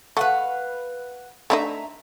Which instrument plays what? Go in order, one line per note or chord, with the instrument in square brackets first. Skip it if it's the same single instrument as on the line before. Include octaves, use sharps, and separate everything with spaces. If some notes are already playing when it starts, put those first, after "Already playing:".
[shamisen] A3 [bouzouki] B4 F5 F#5
[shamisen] A3 D4 D#4 [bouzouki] E5 A#5